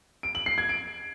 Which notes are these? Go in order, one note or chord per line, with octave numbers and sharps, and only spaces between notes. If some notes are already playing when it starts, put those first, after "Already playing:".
D7
F#7
C7
G#6
D7